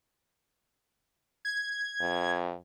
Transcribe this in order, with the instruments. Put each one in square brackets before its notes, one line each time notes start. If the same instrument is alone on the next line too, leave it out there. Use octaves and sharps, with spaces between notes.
[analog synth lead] G#6
[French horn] F2